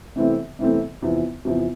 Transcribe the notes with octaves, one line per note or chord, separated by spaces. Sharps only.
C3 E3 A3 C4
C3 E3 A3 C4
E2 C3 F3
E2 C3 F3